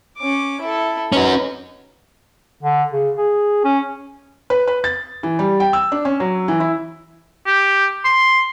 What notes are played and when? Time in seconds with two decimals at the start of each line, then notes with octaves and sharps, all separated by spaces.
0.18 C#4 D6
0.61 E4 A4
1.12 C#4 D#4 F#4 B4
2.63 D3
2.93 C#3
3.17 G#4
3.64 C#4
4.50 B4
4.68 B4
4.84 A6
5.23 E3
5.39 G3
5.60 G5
5.73 E6
5.92 D4
6.05 C#4
6.20 F#3
6.48 E3
6.60 E4
7.46 G4
8.04 C6